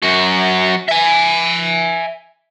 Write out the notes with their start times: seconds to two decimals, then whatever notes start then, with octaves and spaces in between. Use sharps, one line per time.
0.03 F#2 F#4
0.88 E5 G#5